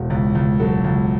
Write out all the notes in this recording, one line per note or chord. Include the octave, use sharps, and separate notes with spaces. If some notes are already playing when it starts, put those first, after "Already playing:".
Already playing: E1
C#2
C#2
F#3 A4
C#2